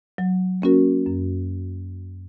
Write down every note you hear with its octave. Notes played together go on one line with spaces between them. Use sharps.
F#3
A#3 C#4 F#4 A#4
F#2